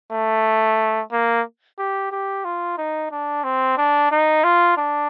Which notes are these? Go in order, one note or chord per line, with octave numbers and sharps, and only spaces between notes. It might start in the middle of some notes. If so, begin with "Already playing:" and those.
A3
A#3
G4
G4
F4
D#4
D4
C4
D4
D#4
F4
D4